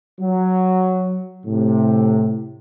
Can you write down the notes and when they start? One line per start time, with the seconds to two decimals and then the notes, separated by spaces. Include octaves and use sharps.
0.20 F#3
1.45 A2 C3